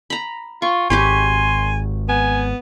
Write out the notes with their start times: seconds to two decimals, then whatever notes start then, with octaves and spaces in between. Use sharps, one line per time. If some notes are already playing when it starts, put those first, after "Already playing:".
0.10 A#5 B5
0.62 F4 C#6
0.90 G#1 G4 B4 C#5 G#5 C6
2.09 B3 G#5